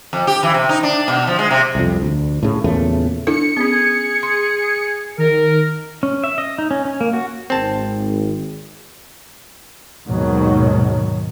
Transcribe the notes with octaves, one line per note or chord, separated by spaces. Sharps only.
F2
G4
E3
C3
D#4
D4
B2
F3
G#3
C3
C2 F2
D2
A2 C#3
E2 A#2 C#3 A3
D4 E4 A4 C#7
B3 C#4 G#4
C6
D#3 A#4
C#4
E5
D#5
D#4
C#4
C#4
A#3
F#4
G#1 C4 A5
D#2 G#2 B2 D#3 F#3